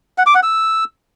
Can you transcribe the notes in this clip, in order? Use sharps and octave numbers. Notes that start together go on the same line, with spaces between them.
F#5
D6
F#5
E6